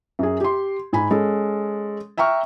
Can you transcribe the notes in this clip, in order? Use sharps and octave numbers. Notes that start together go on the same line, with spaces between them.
F#2 G#4
G4 C6
G#2 G#5 B5
G#3 C#4 A4
E5 G5 A#5 C#6 F6